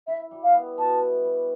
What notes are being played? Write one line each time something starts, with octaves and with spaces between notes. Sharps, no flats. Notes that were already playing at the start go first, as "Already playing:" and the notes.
E4 E5
G3
F5
B3
B2 A5
E4
G3